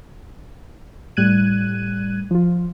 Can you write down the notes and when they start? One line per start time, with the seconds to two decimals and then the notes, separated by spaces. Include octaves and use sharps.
1.17 A2 G3 F#6 G#6 D#7
2.31 F3 F4